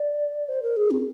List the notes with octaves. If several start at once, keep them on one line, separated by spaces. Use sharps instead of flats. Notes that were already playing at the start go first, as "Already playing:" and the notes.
Already playing: D5
C5
A#4
G#4
C4